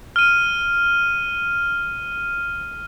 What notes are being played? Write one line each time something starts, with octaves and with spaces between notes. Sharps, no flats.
F6 D#7